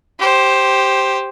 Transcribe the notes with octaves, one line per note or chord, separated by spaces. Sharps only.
G4 C5